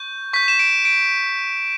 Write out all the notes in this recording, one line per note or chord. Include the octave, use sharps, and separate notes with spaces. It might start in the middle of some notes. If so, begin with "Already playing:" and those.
Already playing: C#6 G6
C#6 G6 B6
E7
D7
D7